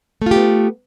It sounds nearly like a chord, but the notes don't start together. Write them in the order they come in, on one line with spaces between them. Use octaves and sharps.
A3 F4 G4 B3